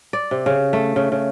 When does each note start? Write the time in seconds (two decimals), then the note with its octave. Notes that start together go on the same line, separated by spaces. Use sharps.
0.13 D5
0.31 C3
0.46 C#3
0.73 A3
0.96 C#3
1.12 C#3